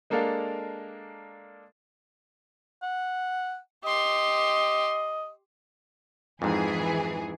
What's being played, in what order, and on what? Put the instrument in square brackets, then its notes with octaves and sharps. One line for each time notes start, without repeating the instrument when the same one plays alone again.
[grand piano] G#3 A#3 D4 A4 A#4 F5
[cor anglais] F#5
[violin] G4 C6 [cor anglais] D#5
[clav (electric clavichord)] F2 G#2 [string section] E3 G#4